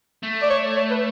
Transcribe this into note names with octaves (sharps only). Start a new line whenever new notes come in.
A3
D5
C#5
C#5
B4